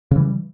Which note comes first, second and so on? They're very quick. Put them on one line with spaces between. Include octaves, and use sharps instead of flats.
C#3 E3 G3